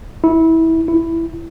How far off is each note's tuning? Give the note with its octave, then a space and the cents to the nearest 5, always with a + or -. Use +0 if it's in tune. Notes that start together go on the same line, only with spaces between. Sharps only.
E4 -20
E4 +5